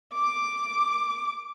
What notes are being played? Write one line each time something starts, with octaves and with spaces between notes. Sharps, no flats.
D6